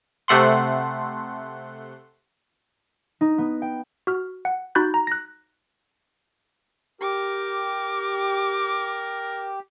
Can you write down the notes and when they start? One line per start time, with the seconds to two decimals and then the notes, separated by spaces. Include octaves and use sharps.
0.28 C3 A3 F#5 C6
3.21 D#4
3.38 B3
3.62 G5
4.07 F#4 F6
4.45 F#5
4.75 D#4 F#4 B5 F#6 G6 A6
4.94 A#5
5.07 F#6 A#6
7.01 G4 A#4 D6